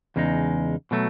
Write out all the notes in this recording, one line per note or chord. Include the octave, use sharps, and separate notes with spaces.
E2 C#3 G#3 D#4
B2 F#3 A3